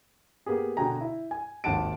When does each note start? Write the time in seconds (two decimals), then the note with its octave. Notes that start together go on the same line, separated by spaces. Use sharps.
0.46 A#3 B3 G4 G#4
0.77 B2 D3 G5 G#5 A#5
1.01 E4
1.31 G#5
1.64 G#1 D#2 F#5 A5 D7